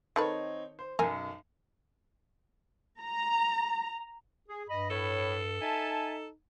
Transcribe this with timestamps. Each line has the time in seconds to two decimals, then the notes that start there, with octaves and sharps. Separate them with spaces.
0.16 D#3 C4 D#4 A4 B4 C#5
0.79 C5
0.99 B1 F#2 A#4 G#5
3.00 A#5
4.49 G#4
4.69 G2 D#5 B5
4.90 A2 A4 C#5 B5
5.61 D#4 E5 G#5 A5